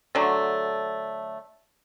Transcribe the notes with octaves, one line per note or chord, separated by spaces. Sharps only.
D3 F#3 A3